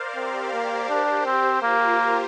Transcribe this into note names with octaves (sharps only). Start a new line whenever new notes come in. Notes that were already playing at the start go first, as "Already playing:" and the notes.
Already playing: A#4 C5 D5 F5
C4 G4 C5
A#3
D4
C4
A#3 F4 A#4